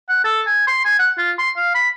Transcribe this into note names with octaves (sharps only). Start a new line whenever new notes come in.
F#5
A4
G#5
C6
G#5
F#5
F4
C6
F5
B5